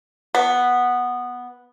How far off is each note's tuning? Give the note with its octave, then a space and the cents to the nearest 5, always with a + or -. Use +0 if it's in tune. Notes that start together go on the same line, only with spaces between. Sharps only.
B3 -5